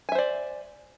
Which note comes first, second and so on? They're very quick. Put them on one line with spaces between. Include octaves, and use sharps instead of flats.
G#5 E5 C5 D5